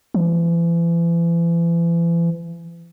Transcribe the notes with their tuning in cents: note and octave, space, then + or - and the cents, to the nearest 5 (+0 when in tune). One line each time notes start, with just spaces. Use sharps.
E3 +40